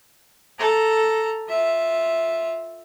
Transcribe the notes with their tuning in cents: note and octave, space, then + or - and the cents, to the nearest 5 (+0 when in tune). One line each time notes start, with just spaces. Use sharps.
A4 +0 A#5 +0
F4 +0 E5 -5